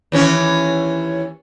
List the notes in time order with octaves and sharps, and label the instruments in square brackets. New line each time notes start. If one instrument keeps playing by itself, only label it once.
[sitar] D#2 E3 C#4